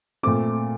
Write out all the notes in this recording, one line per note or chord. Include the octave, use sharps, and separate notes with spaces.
A#2 A3 C4 D6